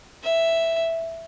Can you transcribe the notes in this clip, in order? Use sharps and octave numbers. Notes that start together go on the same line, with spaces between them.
E5